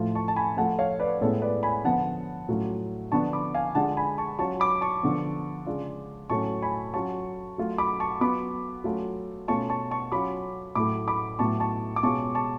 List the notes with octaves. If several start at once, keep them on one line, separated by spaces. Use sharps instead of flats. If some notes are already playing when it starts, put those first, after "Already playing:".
Already playing: A2 F3 A3 F4
A5 C#6
A5
G#5 B5
F3 A3 F4 F#5 A5
C#5 F5
B4 D5
A2 G#3 B3 A4 C#5
B4 D5
G#5 B5
D3 F3 B3 D4 F#5 A5
A2 F#3 A3 C#4 F4
D3 F3 B3 D4 A5 C#6
B5 D6
F5 G#5
D3 G#3 D4 F4 F#5 A5
G#5 B5
A5 C#6
F#3 C#4 F4 A5 C#6
B5 D6
A5 C#6
D3 F3 B3
C#3 G#3 D4 F4
A2 F#3 A3 C#4 A5 C#6
G#5 B5
F#3 C#4 F4 A5 C#6
F#3 A3 F4
B5 D6
A5 C#6
F#3 B3 F4 B5 D6
F#3 A3 C#4 F4
B2 A3 C#4 F4 A5 C#6
A5 C#6
A5 C#6
F#3 C#4 F4 B5 D6
A2 F#3 A3 B5 D6
B5 D6
A2 F#3 B3 A5 C#6
A5 C#6
D6
B2 G#3 C#4 F4 A5 C#6
A5 C#6